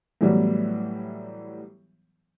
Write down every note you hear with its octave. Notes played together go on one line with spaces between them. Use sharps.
A2 E3 F#3 G3 B3